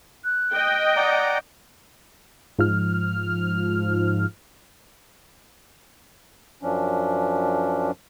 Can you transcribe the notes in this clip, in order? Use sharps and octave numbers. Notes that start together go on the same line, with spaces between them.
F#6
D#5 G5
D5 F#5 A#5
G#2 F3 F6
F#2 F3 C#4 D4